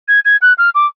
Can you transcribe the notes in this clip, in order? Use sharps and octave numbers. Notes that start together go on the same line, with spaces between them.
G#6
G#6
F#6
F6
D6